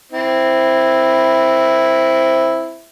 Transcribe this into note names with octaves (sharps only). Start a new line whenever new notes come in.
C4 E4